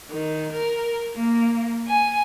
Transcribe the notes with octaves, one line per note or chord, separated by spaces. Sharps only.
D#3
A#4
A#3
G#5